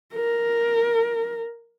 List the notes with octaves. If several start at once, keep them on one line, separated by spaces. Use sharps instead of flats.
A#4